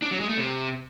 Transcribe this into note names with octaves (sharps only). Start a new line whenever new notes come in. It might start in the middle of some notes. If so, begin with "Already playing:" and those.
D4
F#3
G#3
A3
C3